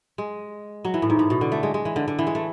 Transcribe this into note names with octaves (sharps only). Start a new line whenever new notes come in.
G#3
F#3
E3
A2
G#2
A2
B2
D3
A3
G#3
G#3
E3
D3
D3
E3
G#3
A3